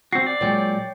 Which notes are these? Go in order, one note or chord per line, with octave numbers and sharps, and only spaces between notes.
C4 F#4 C7
D5
A#2 F#3 G#3 C#5 G5